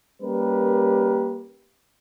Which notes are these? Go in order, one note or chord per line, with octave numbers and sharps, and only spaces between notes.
G3 A#3 C#4 G4 A#4 B4